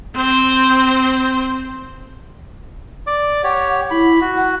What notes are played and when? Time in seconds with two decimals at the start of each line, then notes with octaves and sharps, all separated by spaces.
0.14 C4 C5
3.07 D5 D6
3.44 G4 C#5 F#5
3.91 E4 B5
4.21 F#4
4.37 F#5